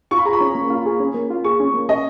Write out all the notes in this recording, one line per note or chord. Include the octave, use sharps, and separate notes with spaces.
F4 C#6
B5
G#4 A#5
B5
C#4
A#3
F4
G#4
C#4
A#3
F4
G#4 C#6
C#4
A#3
C#4 D#5